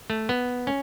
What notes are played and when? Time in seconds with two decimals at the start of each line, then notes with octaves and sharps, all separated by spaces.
0.10 A3
0.29 B3
0.67 C#4